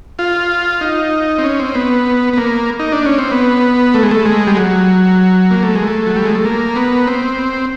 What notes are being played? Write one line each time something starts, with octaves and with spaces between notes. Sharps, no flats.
F4
D#4
C4
C#4
C4
B3
B3
A#3
D#4
D4
C#4
C4
B3
A3
G#3
A3
G#3
G3
F#3
A#3
A3
G#3
A3
F#3
G3
G#3
A3
A#3
B3
C4